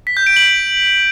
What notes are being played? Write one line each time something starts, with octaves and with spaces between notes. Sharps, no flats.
B6
G6
D7
F#7